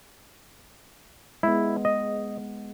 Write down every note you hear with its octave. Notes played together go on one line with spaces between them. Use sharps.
G#3 B3 E4
D#5